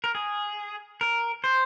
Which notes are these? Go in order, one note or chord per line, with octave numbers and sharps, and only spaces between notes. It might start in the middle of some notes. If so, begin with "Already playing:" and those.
A#4
G#4
A#4
C5